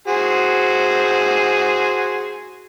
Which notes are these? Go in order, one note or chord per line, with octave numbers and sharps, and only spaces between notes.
F#4 G#4 C5